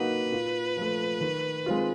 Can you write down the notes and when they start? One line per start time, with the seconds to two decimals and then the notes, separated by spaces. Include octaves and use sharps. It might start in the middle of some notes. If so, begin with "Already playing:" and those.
Already playing: F#3 A#3 D#4 F#4 B4
0.32 A#2
0.77 F3 A3
1.21 D#3
1.66 G#3 C4 F4